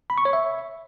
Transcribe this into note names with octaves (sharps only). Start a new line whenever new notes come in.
B5
C#6
C#5
E5